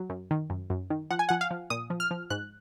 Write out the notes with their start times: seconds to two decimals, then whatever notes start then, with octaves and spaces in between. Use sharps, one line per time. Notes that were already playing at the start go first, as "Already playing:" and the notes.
Already playing: F#3
0.10 F#2
0.31 D#3
0.50 F#2
0.70 F#2
0.90 D#3
1.11 F3 F#5
1.19 G#5
1.29 F3 F#5
1.41 F5
1.51 F3
1.70 A#2 D#6
1.90 F3
2.00 F6
2.11 F3
2.30 G#2 F#6